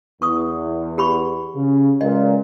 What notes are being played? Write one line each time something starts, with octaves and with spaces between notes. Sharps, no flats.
E2 C#6 D#6
G4 B5 C#6
C#3
C#2 A#2 D#5